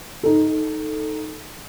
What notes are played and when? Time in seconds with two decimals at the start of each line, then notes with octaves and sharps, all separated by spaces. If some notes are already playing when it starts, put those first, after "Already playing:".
0.23 D#4 A4